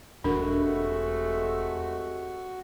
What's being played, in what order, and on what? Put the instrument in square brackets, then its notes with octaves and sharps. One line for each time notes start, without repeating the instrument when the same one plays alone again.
[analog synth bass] E1 [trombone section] C3 G#3 A3 [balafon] D4 A#4 [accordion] F#4